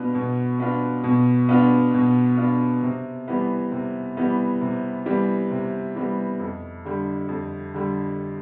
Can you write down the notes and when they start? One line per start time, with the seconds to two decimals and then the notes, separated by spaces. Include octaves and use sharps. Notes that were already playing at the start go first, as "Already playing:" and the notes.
Already playing: B2 B3 D4 F4
0.14 B2
0.60 B3 D4 F4
1.04 B2
1.49 B3 D4 F4
1.94 B2
2.37 B3 D4 F4
2.82 C3
3.28 E3 G3 B3
3.71 C3
4.17 E3 G3 B3
4.61 C3
5.06 E3 G3 B3
5.51 C3
5.96 E3 G3 B3
6.40 F2
6.85 D3 G3
7.29 F2
7.74 D3 G3